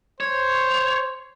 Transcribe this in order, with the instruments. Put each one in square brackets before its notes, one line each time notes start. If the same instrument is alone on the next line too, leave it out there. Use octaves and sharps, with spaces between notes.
[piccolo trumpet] C5 [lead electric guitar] C#5